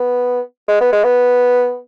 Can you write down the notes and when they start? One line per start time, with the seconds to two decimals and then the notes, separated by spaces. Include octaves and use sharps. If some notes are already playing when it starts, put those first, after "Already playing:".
Already playing: B3
0.68 G#3
0.81 B3
0.92 G#3
1.04 B3